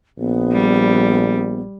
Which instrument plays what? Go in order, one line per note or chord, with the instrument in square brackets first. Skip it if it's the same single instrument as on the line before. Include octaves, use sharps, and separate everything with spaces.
[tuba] A#1 [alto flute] B3
[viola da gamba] G3